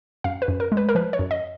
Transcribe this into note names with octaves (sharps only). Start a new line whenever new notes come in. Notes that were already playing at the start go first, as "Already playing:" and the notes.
F#2 F5
B4
F#2
A#4
G#3
B4
A#4
F3 B4
C#5
F#2
D#5